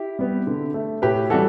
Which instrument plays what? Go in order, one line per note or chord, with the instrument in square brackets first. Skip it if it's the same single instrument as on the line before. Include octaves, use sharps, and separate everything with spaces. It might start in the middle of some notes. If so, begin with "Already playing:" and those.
Already playing: [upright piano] E4 G4
G3 B3
D3
A3
A2 G4 B4
E3 G3 F#4 A4